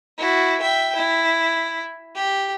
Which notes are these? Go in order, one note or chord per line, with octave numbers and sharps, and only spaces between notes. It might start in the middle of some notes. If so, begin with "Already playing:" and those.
E4 F#4
E5 G5
E4
G4